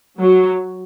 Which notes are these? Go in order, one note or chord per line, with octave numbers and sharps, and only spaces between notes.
F#3